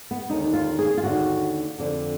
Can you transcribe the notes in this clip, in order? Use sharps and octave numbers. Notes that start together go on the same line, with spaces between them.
B3
D#2 D3 D#4
F4
G#4
F4
D#2 D3 F#4
F2 D3